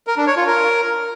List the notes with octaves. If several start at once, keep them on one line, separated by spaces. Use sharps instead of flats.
A#4
D4
C#5
F4
A#4